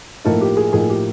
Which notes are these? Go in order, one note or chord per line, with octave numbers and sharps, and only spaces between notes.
A2 F3 A3 A#3 D#4 A4
G4
G#4
A2 F3 A#3 D#4 G#4
G4